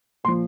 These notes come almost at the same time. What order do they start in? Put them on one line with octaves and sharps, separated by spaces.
A#2 C6 F3